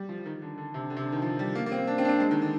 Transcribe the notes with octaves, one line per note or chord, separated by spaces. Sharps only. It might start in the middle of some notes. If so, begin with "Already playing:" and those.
Already playing: G3
F3
D#3
D3
D3
C3
D3
C3
D3
D#3
F3
G3
A#3
A#3
C4
D4
C4
D4
C4
G#3
D#3
D3